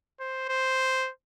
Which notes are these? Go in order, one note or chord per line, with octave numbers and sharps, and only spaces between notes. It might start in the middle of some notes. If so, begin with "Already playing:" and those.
C5
C5